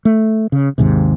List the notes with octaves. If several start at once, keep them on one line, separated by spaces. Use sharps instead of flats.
A3
C#3
G#1 D#2 G#2 C3